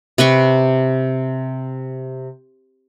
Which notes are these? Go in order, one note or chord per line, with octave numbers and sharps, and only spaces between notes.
C3 B4 G5 C#6